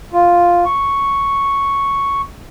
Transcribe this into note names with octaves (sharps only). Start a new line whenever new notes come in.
F4
C#6